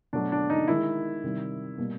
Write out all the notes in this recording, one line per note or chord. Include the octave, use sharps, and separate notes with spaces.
B2 F#3 A3 D4
D4
D#4
D#3 G#3 E4
C3 D#3 G3
B2 G3 A#3